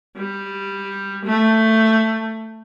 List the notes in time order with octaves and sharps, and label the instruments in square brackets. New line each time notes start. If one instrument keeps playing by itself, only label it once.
[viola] G3
A3